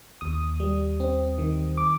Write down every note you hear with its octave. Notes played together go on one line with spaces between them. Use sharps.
D#2 D#6
G3
C4
D#3
D6